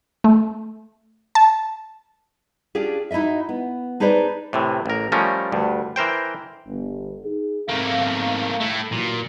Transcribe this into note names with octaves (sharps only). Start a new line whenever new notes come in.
A3
A5
C#4 D4 F4 G4 G#4
D#4 E4 F#4 D#5 E5
B3
D4 D#4 G#4 B4 C5 D5
A2 C3 E3
A1 A#4
F3 G3 A3 C#4 A#4
D2 G2
E3 A#4 C5 G5
G1
D#4 G#4
G#2 A3 A#3 C4 F5
A3 E4
A#2 E3 F#3 A#3